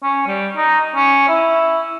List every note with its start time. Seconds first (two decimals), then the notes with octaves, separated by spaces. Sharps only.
0.03 C#4
0.27 G3
0.56 D#4
0.95 C#4
1.29 E4